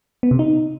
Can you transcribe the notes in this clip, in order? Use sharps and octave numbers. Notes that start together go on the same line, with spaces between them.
B3
C3
D#4